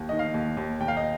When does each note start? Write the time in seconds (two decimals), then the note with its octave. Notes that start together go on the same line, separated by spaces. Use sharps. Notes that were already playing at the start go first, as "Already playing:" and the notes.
Already playing: D#2
0.09 D#3 D#5
0.19 F5
0.34 D#2
0.57 D#2
0.80 D#2 G5
0.88 F5
0.97 D#5